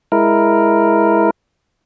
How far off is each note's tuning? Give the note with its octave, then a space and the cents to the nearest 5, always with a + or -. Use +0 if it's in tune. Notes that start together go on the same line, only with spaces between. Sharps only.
G#3 +0 E4 +0 A#4 +0